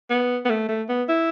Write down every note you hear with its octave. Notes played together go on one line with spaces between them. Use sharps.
B3
B3
A3
A3
B3
E4